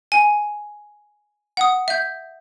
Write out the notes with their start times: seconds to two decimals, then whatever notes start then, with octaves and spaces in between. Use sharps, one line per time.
0.12 G#5
1.57 F#5 D#6
1.88 E5 G6